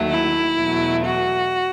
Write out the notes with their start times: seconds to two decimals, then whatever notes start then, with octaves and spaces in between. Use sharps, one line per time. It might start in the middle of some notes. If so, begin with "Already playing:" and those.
Already playing: D#2 D#3 F#3 A3
0.09 E4
0.56 E2 B2 F#3 A3
1.05 F#4